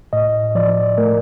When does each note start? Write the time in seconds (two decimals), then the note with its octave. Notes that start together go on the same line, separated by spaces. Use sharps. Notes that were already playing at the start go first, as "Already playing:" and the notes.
0.13 A2 D#5
0.55 F3 D5
0.98 A3 A#4